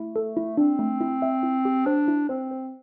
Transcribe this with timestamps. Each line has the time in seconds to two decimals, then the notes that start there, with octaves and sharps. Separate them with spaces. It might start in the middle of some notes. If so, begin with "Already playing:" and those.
Already playing: A3 E4
0.16 A4
0.37 E4
0.57 C4 D4
0.79 A3
1.01 E4
1.22 E5
1.43 E4
1.65 G4
1.86 D4 C5
2.08 E4
2.29 C4 C5
2.51 C5